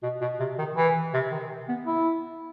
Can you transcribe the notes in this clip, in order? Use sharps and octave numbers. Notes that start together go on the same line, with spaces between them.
B2
B2
C3
D#3
E3
C3
D#3
B3
E4